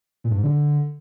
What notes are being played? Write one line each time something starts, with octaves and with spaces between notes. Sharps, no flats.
A#2
G2
G#2
D3